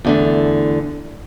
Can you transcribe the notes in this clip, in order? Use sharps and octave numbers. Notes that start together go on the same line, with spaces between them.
E2 D3 A3